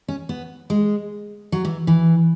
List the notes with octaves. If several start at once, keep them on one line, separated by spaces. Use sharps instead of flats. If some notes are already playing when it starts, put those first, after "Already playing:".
C#4
B3
G#3
F#3
E3
E3